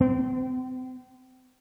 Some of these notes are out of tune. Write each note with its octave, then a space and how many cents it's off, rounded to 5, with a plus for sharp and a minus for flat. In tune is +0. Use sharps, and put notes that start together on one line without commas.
C4 -35